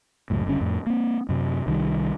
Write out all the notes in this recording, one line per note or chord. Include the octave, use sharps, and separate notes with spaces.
C#2 F#2 A2
F#1 G2 D3 C#4
F2 A2
A#3 C4
F#2 C3
C2 D#3 F3 G3